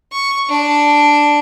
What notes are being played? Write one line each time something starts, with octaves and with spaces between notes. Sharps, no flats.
C#6
D4